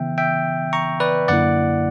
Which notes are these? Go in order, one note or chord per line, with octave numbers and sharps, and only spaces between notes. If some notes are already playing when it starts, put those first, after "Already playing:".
Already playing: C#3 E3 B3 E5 G5
E5 G5
A#5 C#6
B4 D5
F#2 D3 A#3 E4 D5 F#5